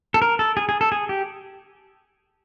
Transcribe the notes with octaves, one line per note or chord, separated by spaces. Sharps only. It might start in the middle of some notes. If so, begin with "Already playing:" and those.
A4
A#4
A4
G#4
G#4
A4
G#4
G4